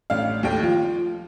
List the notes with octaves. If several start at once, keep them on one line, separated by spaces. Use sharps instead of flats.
A1 D4 F5
D#2 A3 G5
F3 F4